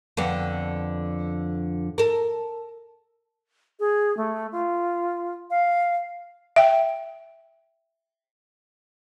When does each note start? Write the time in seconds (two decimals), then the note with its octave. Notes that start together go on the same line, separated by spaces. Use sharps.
0.17 F2 D3 B3
1.98 A4 A#4
3.80 G#4
4.17 A3
4.52 F4
5.51 F5
6.56 E5 G5